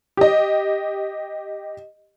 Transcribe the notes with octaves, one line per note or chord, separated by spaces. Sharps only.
G4 D#5